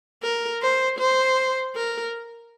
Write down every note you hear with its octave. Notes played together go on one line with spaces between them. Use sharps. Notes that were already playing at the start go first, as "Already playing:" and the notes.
A#4
C5
C5
A#4